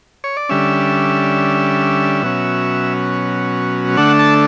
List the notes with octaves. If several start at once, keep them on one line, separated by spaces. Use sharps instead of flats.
C#5
D5
D3 G3 C#4 E5
B2 F#3 C#4
D3 A3 D4 F#5
A5